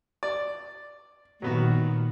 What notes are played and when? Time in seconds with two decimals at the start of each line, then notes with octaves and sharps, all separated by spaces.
0.23 D5
1.42 A#2 D#3 F#3 B3 F#4